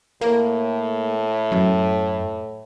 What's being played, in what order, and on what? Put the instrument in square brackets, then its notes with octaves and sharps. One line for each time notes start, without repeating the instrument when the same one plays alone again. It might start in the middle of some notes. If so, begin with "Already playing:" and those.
[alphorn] A2 [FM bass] A#3
[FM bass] F#2